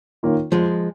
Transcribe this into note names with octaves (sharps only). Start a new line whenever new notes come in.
D#3 A#3 C#4 F4
F2 F3 G#3